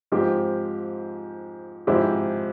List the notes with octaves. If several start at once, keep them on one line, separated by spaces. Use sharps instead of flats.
G#2 F3 C4 G4
G#2 F3 C4 E4 G4